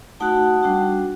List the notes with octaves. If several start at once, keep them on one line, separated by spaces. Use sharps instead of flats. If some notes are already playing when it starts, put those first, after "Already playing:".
A3 D#4 F#4 F#5 A5
G3 D4 F#4